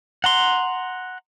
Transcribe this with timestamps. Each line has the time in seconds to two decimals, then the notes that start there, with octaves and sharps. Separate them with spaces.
0.24 F#5 A#5 C6